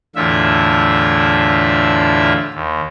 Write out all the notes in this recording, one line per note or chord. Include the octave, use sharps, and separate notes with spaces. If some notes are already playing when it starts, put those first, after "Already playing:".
E2 A2 D3 F4 E5
D#2